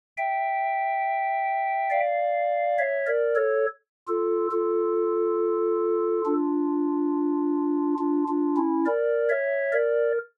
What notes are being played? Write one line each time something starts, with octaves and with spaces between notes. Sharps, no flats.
E5 G5
D5 F5
C#5 E5
A#4 D5
A4 C#5
F4 A4
F4 A4
D4 F4
D4 F4
D4 F4
C#4 E4
A#4 D5
C#5 E5
A#4 D5